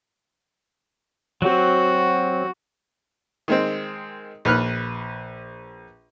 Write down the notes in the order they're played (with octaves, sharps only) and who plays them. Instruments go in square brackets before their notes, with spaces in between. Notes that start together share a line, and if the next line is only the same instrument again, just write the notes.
[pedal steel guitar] F#3 C4 [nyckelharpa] F#4
[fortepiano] D#3 G#3 C4
A#1 B4 F6 F#6